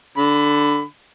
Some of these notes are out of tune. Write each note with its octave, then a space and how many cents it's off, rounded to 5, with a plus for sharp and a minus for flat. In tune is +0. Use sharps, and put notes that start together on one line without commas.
D3 +0 B5 +20